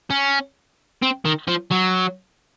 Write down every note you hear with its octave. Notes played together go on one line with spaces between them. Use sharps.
C#4
C4
D#3
F3
F#3